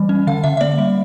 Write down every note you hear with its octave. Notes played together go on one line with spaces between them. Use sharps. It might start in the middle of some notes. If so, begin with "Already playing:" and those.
Already playing: E3 G3
C#4
D3 F5
D3 E5
E5
A#3 D5
G3